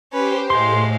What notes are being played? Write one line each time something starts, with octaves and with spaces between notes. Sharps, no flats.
C#4 G4 B4 C5
A2 G#3 F5 C6